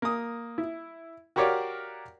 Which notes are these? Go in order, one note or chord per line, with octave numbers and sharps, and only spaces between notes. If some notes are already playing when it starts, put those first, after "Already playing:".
A#3 D#6
E4
F#4 G4 A#4 C#5 D5 F5